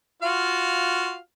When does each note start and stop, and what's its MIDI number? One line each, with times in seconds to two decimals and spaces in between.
0.22 1.17 65
0.22 1.17 66
0.22 1.17 77